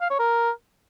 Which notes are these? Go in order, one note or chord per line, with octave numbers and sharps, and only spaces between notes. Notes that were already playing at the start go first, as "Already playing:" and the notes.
F5
C#5
A#4